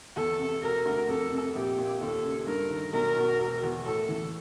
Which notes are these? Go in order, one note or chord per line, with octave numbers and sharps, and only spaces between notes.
E2 A4
C3
E1 A#4
D2
F2 A4
C3
A#1 G4
A#2
D#2 A4
C#3
G2 A#4
D#3
B1 A#4
B2
E1
E2
A2 A4
E3